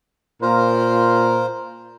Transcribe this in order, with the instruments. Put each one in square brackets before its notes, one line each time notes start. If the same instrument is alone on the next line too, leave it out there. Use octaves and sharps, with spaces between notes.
[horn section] A#2 A#4 [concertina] F4 C5